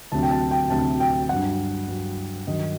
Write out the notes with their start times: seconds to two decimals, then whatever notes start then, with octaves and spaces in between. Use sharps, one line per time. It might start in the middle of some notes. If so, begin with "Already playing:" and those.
0.12 D2 C3 F#3 A5
0.23 G5
0.31 A5
0.51 G5
0.70 D2 C3 F#3 A5
1.00 G5
1.29 G2 F#3 F#5
1.88 G2 F#3
2.47 G2 D#3 F#3 D#5